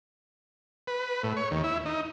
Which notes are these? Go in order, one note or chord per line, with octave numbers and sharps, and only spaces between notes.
B4
A2
C#5
D#2
E4
D#4